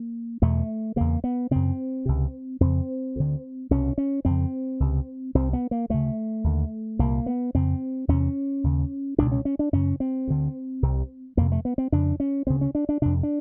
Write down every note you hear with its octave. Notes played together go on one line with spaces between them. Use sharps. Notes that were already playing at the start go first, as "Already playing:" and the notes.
Already playing: A#3
E2 B2 A3
E2 C#3 A#3
B3
F#2 C#3 C4
C#2 C3
F2 C#3 C4
D2 D3
C2 B2 C#4
C#4
F2 C#3 C4
C#2 C3
C2 C3 C4
B3
A#3
D2 C#3 A3
D#2 D3
C2 A#2 A#3
B3
F2 C#3 C4
E2 C3 C#4
D#2 C#3
C#2 B2 D4
C#4
C#4
D4
F#2 C#3 C#4
C4
D2 D3
C2 C3
F2 C3 A#3
A3
B3
C4
F2 C#3 D4
C#4
D2 C#3 C4
C#4
D4
D4
F2 C3 D4
D4